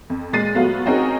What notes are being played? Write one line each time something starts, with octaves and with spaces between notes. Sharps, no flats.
F2
A#2 G#3 A6 C7 D#7
F#3 A3 B3 F4
C4 C#4 D#4 F#4 G#4 A#4